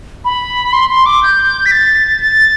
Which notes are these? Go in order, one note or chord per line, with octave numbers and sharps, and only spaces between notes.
B5
C6
C6
D6
G6
B6
A6
A6